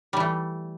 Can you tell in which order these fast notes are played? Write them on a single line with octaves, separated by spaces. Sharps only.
G3 E3 A3